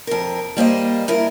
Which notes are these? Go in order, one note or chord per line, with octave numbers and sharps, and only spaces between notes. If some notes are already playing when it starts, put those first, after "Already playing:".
F2 A#4
G3 A#3 C5 D#5
G2 E4 A#4